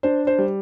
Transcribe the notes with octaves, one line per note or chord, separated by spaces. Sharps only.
D4 C5
C5
G3